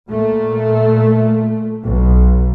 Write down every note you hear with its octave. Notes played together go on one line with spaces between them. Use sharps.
A#2 A3
B1